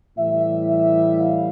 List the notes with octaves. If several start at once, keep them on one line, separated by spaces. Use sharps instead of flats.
A2 E3 G3 E5
E5
F5